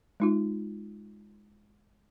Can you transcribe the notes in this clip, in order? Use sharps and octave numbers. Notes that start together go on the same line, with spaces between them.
G#3 D#4 F4